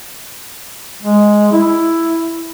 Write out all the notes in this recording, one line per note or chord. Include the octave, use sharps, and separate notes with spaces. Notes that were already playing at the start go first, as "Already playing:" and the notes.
G#3
E4